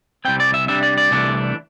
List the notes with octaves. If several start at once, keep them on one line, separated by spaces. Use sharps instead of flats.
C2 C3 G3 C4 G5
D5
E5
C3 G3 D4 E5
D5
D5
C2 C3 E3 A3 D4